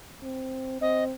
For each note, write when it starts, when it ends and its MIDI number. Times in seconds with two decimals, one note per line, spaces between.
0.23 0.78 60
0.81 1.13 60
0.81 1.04 75